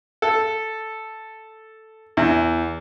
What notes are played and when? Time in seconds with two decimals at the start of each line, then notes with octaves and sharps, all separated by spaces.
0.22 A4
2.17 E2